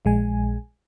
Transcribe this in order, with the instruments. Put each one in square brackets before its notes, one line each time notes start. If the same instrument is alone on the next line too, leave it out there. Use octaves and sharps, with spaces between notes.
[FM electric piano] A#1 G#3 G#5